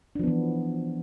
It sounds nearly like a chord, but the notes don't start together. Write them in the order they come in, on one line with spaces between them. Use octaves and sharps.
D4 F3 B3 E3